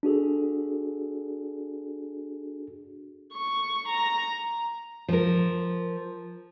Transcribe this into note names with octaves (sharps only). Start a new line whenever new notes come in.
D4 F#4 G#4 A4
C#6
A#5
F3 A#4